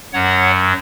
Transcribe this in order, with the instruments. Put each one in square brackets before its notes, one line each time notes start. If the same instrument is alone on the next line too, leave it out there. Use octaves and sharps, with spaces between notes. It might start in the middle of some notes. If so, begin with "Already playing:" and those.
[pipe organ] F#2 F#3 C#5 F#5